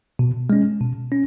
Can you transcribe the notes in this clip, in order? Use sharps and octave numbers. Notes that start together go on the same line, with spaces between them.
B2
G#3 C#4
B2
C#4